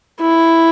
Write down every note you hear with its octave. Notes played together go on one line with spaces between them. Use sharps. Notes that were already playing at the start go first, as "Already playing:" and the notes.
E4